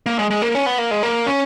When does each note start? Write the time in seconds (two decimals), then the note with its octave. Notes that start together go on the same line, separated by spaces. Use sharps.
0.06 A#3
0.19 G#3
0.30 G#3
0.42 A#3
0.55 C#4
0.66 B3
0.78 A#3
0.91 G#3
1.03 A#3
1.27 C#4